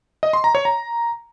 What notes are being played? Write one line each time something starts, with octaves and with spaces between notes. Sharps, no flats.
D#5
C6
A#5
C#5
A#5